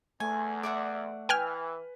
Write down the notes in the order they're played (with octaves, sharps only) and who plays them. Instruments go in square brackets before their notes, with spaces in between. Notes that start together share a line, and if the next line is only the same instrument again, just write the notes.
[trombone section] E2 [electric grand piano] A3 [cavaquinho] G#5
[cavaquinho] D5 E5 F#5
[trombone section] E3 [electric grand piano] B4 [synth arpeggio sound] G5 G#5 F6